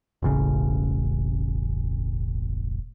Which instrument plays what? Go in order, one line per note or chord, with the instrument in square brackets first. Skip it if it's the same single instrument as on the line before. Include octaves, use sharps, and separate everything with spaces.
[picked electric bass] E1 A1 C#3